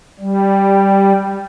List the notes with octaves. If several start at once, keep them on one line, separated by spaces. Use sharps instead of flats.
G3